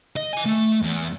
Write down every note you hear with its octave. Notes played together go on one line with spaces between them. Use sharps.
D#5
B4 G#5
A3
E2